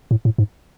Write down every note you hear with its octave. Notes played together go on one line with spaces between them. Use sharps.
A2
A2
G#2